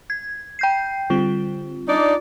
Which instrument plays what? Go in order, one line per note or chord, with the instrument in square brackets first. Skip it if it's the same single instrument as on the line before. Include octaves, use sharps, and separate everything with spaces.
[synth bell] G#6
G5 G6 C7
[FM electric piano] D3 G3 C4 [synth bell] F4
[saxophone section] D4 D#4 D5